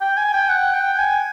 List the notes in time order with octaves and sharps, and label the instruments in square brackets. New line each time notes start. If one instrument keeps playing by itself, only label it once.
[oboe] G5
G#5
G5
F#5
G5
G#5